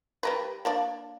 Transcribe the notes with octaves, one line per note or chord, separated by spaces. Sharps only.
G3 A#4 B4
A#3 D4 D5